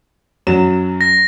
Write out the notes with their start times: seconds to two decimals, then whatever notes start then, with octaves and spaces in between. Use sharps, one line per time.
0.47 F#2 F#3 E7
1.01 A#6